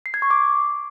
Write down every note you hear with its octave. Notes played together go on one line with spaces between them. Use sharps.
C7
G#6
C#6
D6